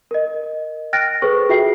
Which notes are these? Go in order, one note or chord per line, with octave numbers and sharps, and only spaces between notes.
A#4 D#5
G5 F6 F#6 A6 A#6 D7
G#4 A4 B4 C5 C#6
F4 F#4 G#4 E5 G5 C7